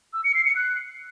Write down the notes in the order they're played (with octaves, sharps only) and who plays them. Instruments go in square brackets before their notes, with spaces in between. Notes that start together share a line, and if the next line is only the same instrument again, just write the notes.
[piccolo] E6
C#7
C7
C#7
F#6